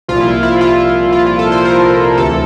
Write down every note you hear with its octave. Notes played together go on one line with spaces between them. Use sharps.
C2 A#2 F3 F4
E4
E4
F4
F4
F4
A4
C5
A#4
D2 C3 E3 A4